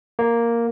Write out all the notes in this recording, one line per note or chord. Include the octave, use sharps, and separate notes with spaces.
A#3